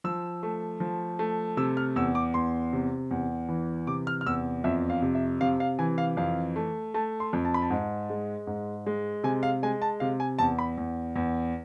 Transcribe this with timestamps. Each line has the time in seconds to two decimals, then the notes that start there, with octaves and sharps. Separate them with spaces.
0.04 F3 E6
0.43 A3
0.80 F3
1.19 A3
1.57 C3 E6
1.77 F6
1.96 E2 E6
2.15 D6
2.34 E2 C6
2.73 C3
3.11 E2
3.49 E3
3.87 C3 D6
4.07 F6
4.21 F6
4.26 E2 E6
4.64 F2 E5
4.90 F5
5.02 C3
5.15 E5
5.41 C3 F5
5.60 F5
5.79 E3 G#5
5.98 F5
6.17 F2 F5
6.56 A3
6.94 A3 A5
7.20 C6
7.33 F2
7.45 A5
7.54 B5
7.62 A5
7.70 G#2
8.10 G#3
8.47 G#2
8.86 G#3
9.24 C3 G#5
9.43 F5
9.63 G#3 G#5
9.82 A5
10.00 C3 F5
10.20 G#5
10.39 E2 A5
10.59 B5
10.78 E2
11.16 E2